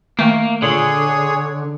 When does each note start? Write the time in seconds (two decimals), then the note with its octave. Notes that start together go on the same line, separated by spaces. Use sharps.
0.19 D#3 A3 A#3
0.62 A#2 D3 G#4 C#5